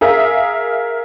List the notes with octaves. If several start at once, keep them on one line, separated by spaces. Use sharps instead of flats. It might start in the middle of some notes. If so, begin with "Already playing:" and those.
G#4 A#4 E5 F5